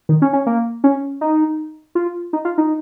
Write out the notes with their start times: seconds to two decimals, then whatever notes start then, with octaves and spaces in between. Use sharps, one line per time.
0.09 D#3
0.22 C#4
0.33 C#4
0.47 A#3
0.84 C#4
1.21 D#4
1.95 F4
2.33 D#4
2.45 F4
2.58 D#4